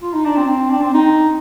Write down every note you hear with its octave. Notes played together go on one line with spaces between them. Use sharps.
F4
D#4
D4
C4
D4
C4
D#4